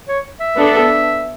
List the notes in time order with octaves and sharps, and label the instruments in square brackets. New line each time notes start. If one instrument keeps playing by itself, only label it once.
[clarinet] C#5
E5
[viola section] B3 D4 A4